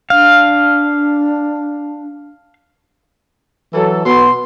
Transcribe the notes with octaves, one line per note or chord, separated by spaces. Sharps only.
D4 F5
E3 F#3 A4
B2 B3 C6